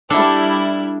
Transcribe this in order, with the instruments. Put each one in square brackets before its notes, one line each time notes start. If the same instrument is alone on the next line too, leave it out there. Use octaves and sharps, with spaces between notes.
[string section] G3 E4 [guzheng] D4 A4